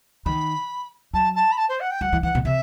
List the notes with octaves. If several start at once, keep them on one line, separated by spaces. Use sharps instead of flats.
D#3 B5
F#3 A5
A5
B5
A5
C5
F#5
G5
F#3 F#5
E3
E3 F#5
B2
C3 E5